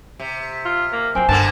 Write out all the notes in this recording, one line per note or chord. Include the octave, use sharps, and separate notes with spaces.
C3
F4
A#3
F#3 C4 F4 G#5
G2 D3 A#3 B3 C5 A5